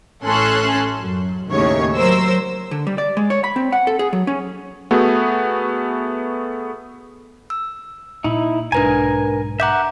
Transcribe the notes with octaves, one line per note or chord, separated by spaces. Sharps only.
A1 A3 C#4 A4 C6 F#6
F#2
D#2 A2 C#3 C#5
F#3 A#4 C5 E6
D3
G3
D5
G#3
C#5
B5
C4
F#5
A4
G#4
F#3
C#4
A3 B3 F#4 G#4
E6
A#2 D#4 E4
B1 G#2 D4 A#4 B4 G#5 A#5
E5 F#5 A#5 D6 G6